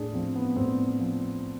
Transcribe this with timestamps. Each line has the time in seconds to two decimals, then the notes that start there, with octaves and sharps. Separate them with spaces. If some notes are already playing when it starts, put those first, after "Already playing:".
Already playing: A2 D4 G#4
0.14 F3 C4
0.35 B3
0.56 A2 C4
1.00 F3